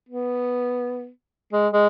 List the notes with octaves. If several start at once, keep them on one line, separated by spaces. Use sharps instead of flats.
B3
G#3
G#3